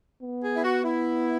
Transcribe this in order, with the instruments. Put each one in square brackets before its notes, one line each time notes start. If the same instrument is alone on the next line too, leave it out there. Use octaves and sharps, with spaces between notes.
[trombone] B3
[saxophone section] G#4
E4
F#4
E4